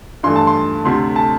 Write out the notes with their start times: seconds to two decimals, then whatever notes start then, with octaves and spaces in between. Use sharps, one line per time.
0.23 G2 E3 A3 C6
0.36 A5
0.47 C6
0.85 D2 C3 A3 C6
1.16 A5